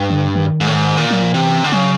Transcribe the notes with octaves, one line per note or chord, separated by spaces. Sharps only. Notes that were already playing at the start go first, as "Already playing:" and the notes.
Already playing: G2
D3
D#3
G#2
A2
G#2
A#2
F#3
F3
C3 E3
D3
C#3 F#3